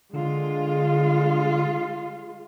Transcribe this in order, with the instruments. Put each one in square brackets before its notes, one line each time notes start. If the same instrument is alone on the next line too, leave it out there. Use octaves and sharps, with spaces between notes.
[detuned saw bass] D3 [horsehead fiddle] G#3 F4